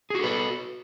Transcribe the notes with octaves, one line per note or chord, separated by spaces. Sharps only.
F#4 G#4 A4 B4